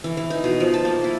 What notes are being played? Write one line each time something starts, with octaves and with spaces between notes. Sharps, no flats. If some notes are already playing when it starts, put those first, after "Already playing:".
E3
E3
D#4
B2
F3
A5
A#3
E4